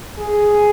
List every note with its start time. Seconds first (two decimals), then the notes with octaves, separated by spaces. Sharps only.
0.18 G#4